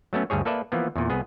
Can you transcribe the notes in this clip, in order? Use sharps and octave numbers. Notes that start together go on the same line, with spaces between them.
F#3 A3 B3 C#4
D2 G2 G3 G#4 C#5
A#3 A4 B4 D5 E5
E3 F3 A#3 B3
E2 A#2
C2 B3 G#4